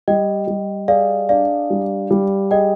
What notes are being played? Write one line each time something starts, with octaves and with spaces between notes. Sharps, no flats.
G3 D#5 G5
G3
G#4 D5 F5
D4 D5 F5
G3
G3
G#4 D#5 G5